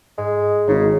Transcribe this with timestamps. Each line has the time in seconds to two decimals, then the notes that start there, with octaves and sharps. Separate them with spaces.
0.18 G#2 G#3
0.68 G#1 C#3 D#4